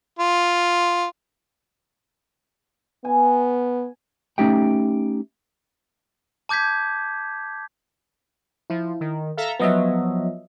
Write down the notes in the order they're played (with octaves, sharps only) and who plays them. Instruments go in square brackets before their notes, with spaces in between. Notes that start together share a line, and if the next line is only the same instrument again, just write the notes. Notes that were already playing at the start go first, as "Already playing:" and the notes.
[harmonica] F4
[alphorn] B3 [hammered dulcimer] G#5
[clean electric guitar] A3 C#4 D#4 G4 E5 G5
[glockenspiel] A5 D6 G6 G#6 B6
[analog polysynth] F3 [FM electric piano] E4
[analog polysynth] D#3
[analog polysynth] A4 E5 A#5 [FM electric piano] F5
[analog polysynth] F3 F#3 [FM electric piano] B3 D#5 E5